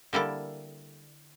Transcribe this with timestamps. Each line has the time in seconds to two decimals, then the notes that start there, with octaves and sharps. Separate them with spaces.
0.13 D3 G3 A#3 E4 A4